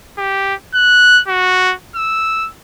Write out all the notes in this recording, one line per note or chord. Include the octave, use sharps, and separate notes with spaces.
G4
F#6
F#4
E6